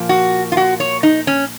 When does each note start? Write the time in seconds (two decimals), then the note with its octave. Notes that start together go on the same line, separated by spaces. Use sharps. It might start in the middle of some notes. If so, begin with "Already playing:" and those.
Already playing: A#2 F3 A#3
0.09 F#4
0.52 F4
0.57 F#4
0.80 C#5
1.03 D#4
1.27 C#4